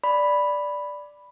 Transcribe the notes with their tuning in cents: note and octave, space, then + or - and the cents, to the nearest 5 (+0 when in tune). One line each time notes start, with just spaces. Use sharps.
D5 +0 B5 +0